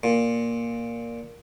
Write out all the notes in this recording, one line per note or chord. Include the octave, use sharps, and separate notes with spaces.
A#2